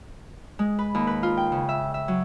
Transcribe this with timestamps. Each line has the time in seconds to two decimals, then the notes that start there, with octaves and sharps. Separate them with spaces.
0.59 G#3
0.79 B4
0.95 D#2
1.07 B4
1.23 F4
1.37 G5
1.52 C#3
1.69 E5
1.94 E5
2.08 F#3